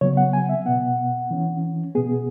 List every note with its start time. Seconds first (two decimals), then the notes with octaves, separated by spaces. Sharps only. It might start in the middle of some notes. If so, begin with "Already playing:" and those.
0.01 C#3 F#3 B3 C#5
0.17 F#5
0.33 G#5
0.49 E5
0.65 B2 B3 F#5
1.31 E3 C#4
1.95 B2 B3 G#4